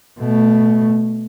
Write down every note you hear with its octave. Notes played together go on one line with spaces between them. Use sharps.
B2 A3